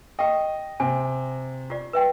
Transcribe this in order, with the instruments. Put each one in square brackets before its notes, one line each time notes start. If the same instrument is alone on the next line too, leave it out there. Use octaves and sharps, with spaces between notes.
[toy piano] G4 G5 [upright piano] D#5
[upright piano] C3 [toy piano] G#5
[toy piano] F4 G4 D5
B4 E5 G5